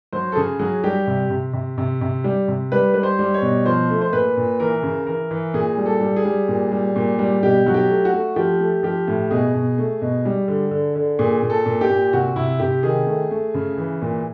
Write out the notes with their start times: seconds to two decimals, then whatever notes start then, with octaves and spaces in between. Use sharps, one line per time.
0.13 F#3 C5
0.32 A4
0.36 C#3 G#4
0.59 F#3 G#4
0.84 G3 G4
1.07 C3
1.30 C3
1.53 C3
1.78 C3
2.01 C3
2.24 G3
2.48 C3
2.72 G3 B4
2.94 G3 B4
3.03 C5
3.19 G3
3.34 C#5
3.42 B2
3.66 F3 C5
3.90 A3
4.01 C5
4.12 A#2 B4
4.37 A#2
4.60 E3 A#4
4.83 C#3
5.07 E3 A#4
5.31 E3
5.54 A#2 G#4
5.77 G3
5.86 A4
6.01 G3
6.16 G#4
6.25 G3
6.48 A#2
6.72 G3
6.96 A#2
7.19 G3
7.43 B2 G4
7.66 F#3 F#4
7.74 G4
7.89 A3
8.05 F#4
8.14 A3
8.36 F3 G4
8.60 A3
8.83 F3 G4
9.08 A2
9.31 B2 G#4
9.54 B2
9.78 A3
10.02 B2
10.25 G3
10.48 D3
10.71 D3
10.96 D3
11.19 A#2 G#4
11.42 A#2
11.50 A4
11.66 A#2
11.81 G4
11.90 A#2
12.13 C3 F#4
12.36 C3 E4
12.59 C3 G4
12.83 D#3 G#4
13.07 A3
13.31 A3
13.54 C#3
13.78 E3
14.02 A#2